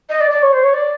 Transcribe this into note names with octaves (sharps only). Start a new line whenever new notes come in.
D#5
D5
D5
C#5
C5
C#5
D5